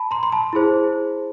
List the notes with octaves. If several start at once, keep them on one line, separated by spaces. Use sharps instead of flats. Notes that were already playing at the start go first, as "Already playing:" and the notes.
Already playing: A5 B5
A#5 C6
C6
A5 B5
E4 G#4 C5